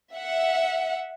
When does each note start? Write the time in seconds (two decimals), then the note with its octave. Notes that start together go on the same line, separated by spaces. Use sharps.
0.13 E5 F#5